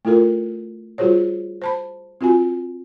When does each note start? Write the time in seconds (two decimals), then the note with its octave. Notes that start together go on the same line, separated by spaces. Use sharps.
0.05 A3 E4 F4 A4 A#4
0.98 G3 F4 F#4 G#4 C5 C#5
1.62 C5 A5 B5
2.21 C4 F4 F#4 G#5